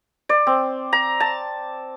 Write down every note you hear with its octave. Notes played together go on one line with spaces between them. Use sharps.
D5
C4
A#5
A5